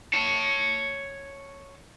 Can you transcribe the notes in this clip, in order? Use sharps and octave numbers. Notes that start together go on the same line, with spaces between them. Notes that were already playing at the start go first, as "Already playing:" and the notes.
C#5 A5